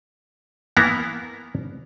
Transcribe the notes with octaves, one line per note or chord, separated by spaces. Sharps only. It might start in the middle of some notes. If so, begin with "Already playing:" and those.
E3 A#3 B3 E4 A#5